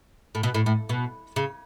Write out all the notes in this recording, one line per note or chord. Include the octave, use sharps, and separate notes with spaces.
A2
B2
A2
A2
B2
C#3